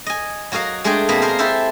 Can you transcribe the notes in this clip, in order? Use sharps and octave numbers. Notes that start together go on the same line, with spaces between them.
D#5 G#5
F#3 F#4 A#4 D#5 F5
G#3 A3 D4 G#4 G5 G#5
B2 A#3 C4 D#5 B5
A#4 C5 D#5 F5
E4 G4 A4 C5 E5